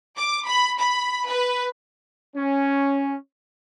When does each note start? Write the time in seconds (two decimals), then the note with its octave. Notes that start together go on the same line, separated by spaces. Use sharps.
0.17 D6
0.47 B5
0.80 B5
1.28 B4
2.35 C#4